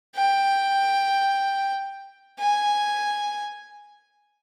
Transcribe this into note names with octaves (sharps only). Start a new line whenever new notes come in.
G5
G#5